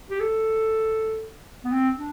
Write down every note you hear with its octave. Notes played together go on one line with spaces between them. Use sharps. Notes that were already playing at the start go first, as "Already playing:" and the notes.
G4
A4
B3
C4
D4